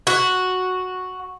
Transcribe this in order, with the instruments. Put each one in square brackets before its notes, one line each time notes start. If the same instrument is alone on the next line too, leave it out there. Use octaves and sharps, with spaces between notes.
[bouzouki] F#4